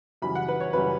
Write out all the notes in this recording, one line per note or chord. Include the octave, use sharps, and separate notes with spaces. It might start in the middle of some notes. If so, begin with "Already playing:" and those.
F#2 C#3 E3 G3 B5
F#5
B4
C#5
F#2 C#3 E3 G3 B4